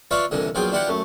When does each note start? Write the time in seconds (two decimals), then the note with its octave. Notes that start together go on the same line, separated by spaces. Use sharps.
0.11 F4 B4 C#5 D5 E5 F5
0.31 C2 A#2 D3 E3 D#5
0.55 A#1 F#3 B3 F4 G#4 G5
0.72 D4 E4 F4 G4 B4 F#5
0.88 F#2 A3